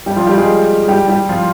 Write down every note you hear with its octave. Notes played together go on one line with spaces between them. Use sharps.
G3 G4
F3 F4
G3 G4
G#3 G#4
G3 G4
G3 G4
F3 F4